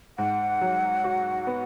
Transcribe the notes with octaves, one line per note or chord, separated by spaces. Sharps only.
G#2 F#5
F#3
F#4
B3